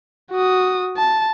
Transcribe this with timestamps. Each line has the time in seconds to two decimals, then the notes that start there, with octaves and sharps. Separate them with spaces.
0.32 F#4 D#6
0.97 A5